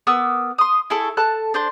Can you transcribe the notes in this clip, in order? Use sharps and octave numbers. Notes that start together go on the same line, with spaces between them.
B3 A#4 D6 E6
C6 D#6
E4 G#4 A4 C#6
A4 A5 F#6
D4 C5 C6